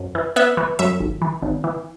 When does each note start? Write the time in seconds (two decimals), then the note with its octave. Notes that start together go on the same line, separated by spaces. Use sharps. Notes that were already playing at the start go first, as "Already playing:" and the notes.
Already playing: F#2
0.15 E3
0.36 B3 E5
0.57 E3
0.79 F#2 E5
1.00 G#1
1.22 E3
1.42 G#1
1.64 E3